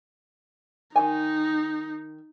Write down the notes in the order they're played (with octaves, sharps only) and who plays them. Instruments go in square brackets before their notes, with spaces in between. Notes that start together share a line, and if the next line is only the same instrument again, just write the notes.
[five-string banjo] D#3 F3 G#5 [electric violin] D#4